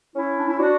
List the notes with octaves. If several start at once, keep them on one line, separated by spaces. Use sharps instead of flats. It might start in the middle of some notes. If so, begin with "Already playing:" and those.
C#4 E4
D4
E4
D4 F#4